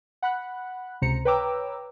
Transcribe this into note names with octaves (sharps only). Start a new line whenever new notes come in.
F#5 B5 F#6
C#2 C3 C5 A#5 C#7
B4 C#5 G5 A#5 D6 E6